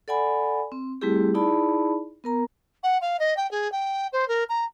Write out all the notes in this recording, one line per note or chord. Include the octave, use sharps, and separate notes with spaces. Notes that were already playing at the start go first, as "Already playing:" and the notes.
A4 D5 F#5 G#5 B5
C4
G3 A3 C4 E4 G4 G#4
D#4 E4 G#4 D5 A5 B5
B3 A#4 A#5
F#5
F5
D#5
G5
G#4
G5
C5
A#4
A#5